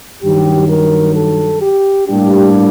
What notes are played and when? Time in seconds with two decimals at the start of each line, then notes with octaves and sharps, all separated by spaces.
0.23 G2 D#3 F#3 G4
0.69 A#4
1.15 A4
1.62 G4
2.08 A2 G3 A#3 D4 G4